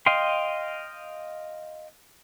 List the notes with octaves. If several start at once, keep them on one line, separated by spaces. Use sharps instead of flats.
D#5 F5 G5 C6